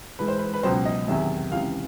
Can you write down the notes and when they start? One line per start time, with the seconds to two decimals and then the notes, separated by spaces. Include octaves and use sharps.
0.19 G#2 E3 B4
0.28 C5
0.38 B4
0.54 B4
0.63 C#2 B2 F#3 C5
0.85 D#5
1.07 E2 C3 D#3 F#3 E5
1.52 C#2 C3 E3 F5